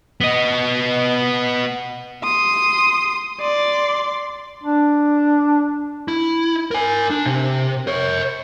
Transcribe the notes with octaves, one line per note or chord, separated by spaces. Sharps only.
B3 D#5
C6 D#6
D5 C6
D4
E4
A#4 G#5
D4
C3
A#4 C#5